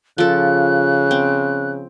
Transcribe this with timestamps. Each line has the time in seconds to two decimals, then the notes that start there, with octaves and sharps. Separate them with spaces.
0.18 C#3 F3 A4 F#6
1.11 C4